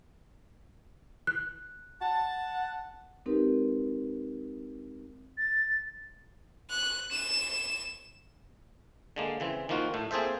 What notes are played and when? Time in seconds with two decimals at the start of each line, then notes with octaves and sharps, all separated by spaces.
1.27 F#6
2.01 F#5 A5
3.26 G#3 C4 D#4 G4 A#4 B4
5.38 A6
6.70 F#6
7.12 E7
9.16 D3 G#3 A#3
9.40 C#3 E3 C4
9.69 D#3 F3 A#3 F4 F#4
9.94 A2 A3
10.11 A#3 C4 G#4 A4 C5 E5